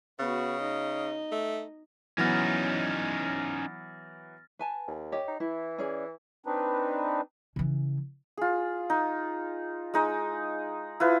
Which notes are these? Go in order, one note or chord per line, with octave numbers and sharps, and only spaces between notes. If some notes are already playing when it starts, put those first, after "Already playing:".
C#3 B3 F#4
D#4 D#5
A3
E3 F#3 B3 C#4 D#4 F6 A6 A#6
B4 G#5 A5
D#2
G4 C#5 D#5
D#4
E3 E4
C#4 G#4 D5
C4 D4 D#4 B4
C#3 E3
F4 G#4
D#4
G#3 D#4 D#5
E4 F4 B4